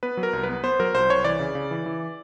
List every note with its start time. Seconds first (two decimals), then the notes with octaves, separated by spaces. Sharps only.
0.03 B3 B4
0.17 F#3
0.23 A#4
0.33 C2
0.43 B4
0.49 B3
0.63 B3 C5
0.80 F#3 A#4
0.94 C2 C5
1.10 C2 C#5
1.25 E3 D5
1.40 C#3
1.55 C#3
1.71 E3
1.86 E3